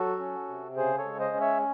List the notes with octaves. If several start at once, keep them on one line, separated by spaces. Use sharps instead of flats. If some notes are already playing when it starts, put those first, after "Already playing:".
Already playing: F#3 F#4 A4
C#4
C3
C#3 G#4 C5
A4 C#5
G#3
C5 D#5
C#4
C#5 E5